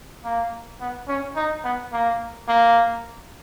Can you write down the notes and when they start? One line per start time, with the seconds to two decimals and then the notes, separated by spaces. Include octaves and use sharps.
0.24 A#3
0.81 B3
1.08 C#4
1.36 D#4
1.64 B3
1.93 A#3
2.48 A#3